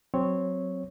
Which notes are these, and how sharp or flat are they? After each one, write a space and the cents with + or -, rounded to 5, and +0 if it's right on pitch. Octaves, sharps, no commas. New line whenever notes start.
F#3 +0 C4 +0 C#5 +0